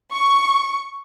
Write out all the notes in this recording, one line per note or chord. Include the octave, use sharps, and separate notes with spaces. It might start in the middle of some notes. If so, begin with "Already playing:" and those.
C#6